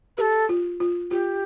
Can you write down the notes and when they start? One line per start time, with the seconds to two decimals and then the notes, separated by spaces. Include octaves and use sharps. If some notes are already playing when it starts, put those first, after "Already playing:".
0.17 G4 A4 B4
0.49 F4
0.80 F4
1.11 F4 G4